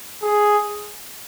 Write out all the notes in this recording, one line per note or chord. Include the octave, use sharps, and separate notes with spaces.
G#4